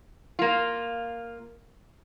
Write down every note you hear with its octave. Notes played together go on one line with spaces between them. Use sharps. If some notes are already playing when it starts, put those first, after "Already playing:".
A#3 F4